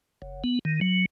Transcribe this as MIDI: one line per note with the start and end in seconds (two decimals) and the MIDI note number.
0.22 0.44 30
0.44 0.59 59
0.65 0.80 51
0.81 1.05 54